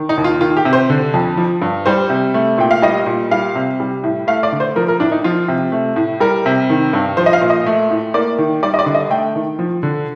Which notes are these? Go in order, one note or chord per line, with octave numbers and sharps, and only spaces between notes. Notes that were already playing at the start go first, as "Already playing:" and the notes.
Already playing: D#3
D#4
D#2
F4
D#3 F4
G4
C3
C5
D3
F2
F3
G2
G3 C5
C3
A3
A#2 G5
F5
G3 D#5
A#2
G3 F5
C3
G3
A2
A3 F5
D5
D3
C5
F3 A#4
A#4
A2 D4
D#4
F3 F4
C3
A3
A2
G3 A#4
C3
D#3
G2
F3 C5
D#5
F5
A#2
D#5
A3
A2
A#3 D5
D#3
G3 D5
D#5
D5
D3
D#5
A3 G5
D#3
F3
D3